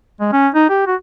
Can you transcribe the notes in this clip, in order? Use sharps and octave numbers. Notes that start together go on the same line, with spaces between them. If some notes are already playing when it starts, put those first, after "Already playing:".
G#3
C#4
D#4
G4
F#4